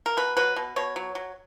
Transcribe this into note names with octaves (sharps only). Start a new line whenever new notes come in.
A#4
B2 B4
F#3 B4
B2
B2 C#5
F#3
F#3